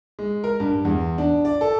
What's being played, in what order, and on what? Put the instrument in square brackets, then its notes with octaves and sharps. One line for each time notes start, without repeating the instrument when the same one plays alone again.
[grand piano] G#3
A#4
G2
E2
D4
D5
A4